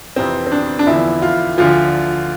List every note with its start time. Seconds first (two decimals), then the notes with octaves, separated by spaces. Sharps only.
0.16 F2 C3 E3 C4
0.47 C4
0.52 D4
0.79 D4
0.87 E2 D3 F3 E4
1.22 F4
1.58 D2 D3 F3 F4